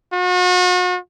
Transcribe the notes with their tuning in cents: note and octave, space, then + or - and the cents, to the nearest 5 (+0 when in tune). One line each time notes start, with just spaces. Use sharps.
F#4 -40